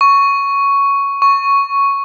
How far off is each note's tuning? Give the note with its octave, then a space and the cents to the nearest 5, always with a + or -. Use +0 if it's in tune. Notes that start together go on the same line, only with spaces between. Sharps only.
C#6 +5
C#6 +0